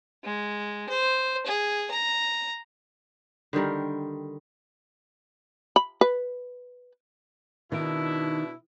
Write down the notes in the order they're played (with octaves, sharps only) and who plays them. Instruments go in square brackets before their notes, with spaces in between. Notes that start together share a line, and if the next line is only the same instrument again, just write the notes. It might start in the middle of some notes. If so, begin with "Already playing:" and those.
[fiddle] G#3
C5
G#4
A#5
[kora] D3 D#3 G3 A#4
[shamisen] B5
B4
[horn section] B2 D4 E4 [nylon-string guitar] D#3